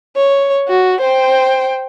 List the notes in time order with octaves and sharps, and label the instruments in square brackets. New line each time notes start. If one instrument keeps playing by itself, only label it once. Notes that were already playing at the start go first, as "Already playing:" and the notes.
[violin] C#5
F#4
C5 G5